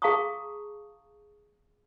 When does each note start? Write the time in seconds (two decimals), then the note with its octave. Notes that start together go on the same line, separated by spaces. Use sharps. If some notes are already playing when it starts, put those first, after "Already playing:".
0.02 G#4 F5 A5 A#5 C#6 D#6